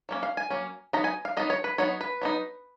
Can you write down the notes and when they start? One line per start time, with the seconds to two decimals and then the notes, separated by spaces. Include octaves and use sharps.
0.09 F#3 A#3 C#4
0.23 F5
0.37 G#5
0.50 F#3 A#3 C#4
0.93 F#3 B3 D#4 A#5
1.04 G#5
1.25 F5
1.37 F#3 B3 D#4 D#5
1.50 C#5
1.64 B4
1.78 F#3 B3 D#4 C#5
2.01 B4
2.21 F#3 B3 D#4